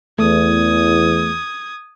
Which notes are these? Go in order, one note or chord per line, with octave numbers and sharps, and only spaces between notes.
E2 A3 D#6 G#6